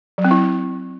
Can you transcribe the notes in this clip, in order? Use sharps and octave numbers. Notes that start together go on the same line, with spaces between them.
F#3
C4
E4